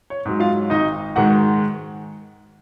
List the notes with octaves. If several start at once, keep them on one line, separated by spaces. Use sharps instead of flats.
C#5
G#2 F#3
F4 F5
G#1 D#4 D#5
G#2 D#3 G#3 F#4 F#5